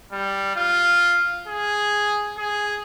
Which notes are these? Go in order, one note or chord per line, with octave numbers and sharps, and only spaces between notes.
G3
F4
G#4
G#4